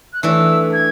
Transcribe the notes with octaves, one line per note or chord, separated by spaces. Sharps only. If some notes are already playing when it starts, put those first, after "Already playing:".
F#6
E3 A3 D4 E6
G#6